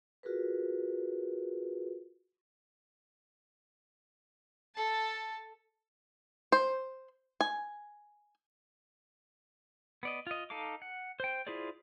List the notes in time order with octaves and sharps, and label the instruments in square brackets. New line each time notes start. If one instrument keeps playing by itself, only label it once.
[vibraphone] F4 F#4 G#4 A#4 B4
[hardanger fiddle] A4 A5
[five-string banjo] C5
G#5
[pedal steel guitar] B3 D5 D#5
F4 D#5
D#4 A4 F5 D6
F#5
C5 G5
E4 F4 G#4 C5 D5